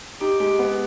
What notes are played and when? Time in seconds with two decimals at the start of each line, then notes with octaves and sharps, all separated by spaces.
0.20 D#4 G4
0.40 G#3 G4
0.59 B3